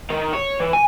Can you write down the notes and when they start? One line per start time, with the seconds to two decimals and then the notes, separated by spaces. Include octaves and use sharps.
0.10 D#3
0.33 C#5
0.60 E3
0.73 G#5